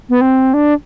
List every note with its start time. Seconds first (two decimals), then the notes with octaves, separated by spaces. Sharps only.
0.09 B3
0.21 C4
0.54 D4